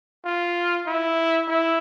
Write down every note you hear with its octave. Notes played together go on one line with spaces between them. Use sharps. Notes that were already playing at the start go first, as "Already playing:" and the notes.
F4
E4
E4